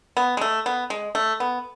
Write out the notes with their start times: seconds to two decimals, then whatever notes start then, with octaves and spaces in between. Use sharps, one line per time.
0.17 B3
0.37 G#3
0.41 A3
0.66 B3
0.90 G#3
1.15 A3
1.40 B3